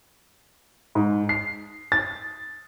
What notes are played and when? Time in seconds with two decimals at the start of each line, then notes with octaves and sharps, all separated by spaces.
0.95 G#2
1.29 C7
1.92 A6